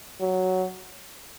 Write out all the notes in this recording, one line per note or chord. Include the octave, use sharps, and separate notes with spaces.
F#3